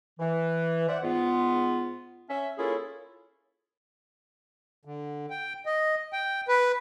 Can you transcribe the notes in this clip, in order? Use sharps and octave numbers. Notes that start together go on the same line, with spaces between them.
E3
C5 D5 E5 F#5
G#2 B3 F4
C#4 E5
A#3 C#4 E4 F4 G#4 A4
D3
G5
D#5
G5
B4